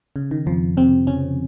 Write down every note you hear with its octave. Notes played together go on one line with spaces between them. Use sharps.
C#3
D#3
F2 F3
C3 C4
C#3 C#4